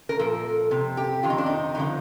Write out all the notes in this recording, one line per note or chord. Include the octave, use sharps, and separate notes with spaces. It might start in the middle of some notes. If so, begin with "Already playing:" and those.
A#4
A#2 F3 A4
F2 C3
G4
F2 C3 D#3 F4
D#4
D4
D#4
G2 D3 F3 D#4